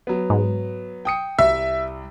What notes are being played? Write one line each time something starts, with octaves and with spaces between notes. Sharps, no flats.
F#3 B3
G#2
G5 D#6 C#7
C2 E5